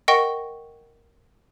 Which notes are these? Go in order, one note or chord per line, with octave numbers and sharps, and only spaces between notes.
A#4 D#5 F#5 G5 C#6 A#6